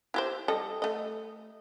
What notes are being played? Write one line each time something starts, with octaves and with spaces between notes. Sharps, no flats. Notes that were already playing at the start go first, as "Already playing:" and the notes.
E4 G4 C5
G3 A4 D#5
A3 D#5